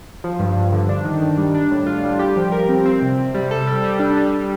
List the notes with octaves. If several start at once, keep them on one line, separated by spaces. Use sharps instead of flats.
F3
G2
G2
D3
D4
D#3
D#3
G3
D4
A2
F4
G3
G4
F3
A#4
C4
C4
C3
C3
G3
A4
G3
G3
D4
G3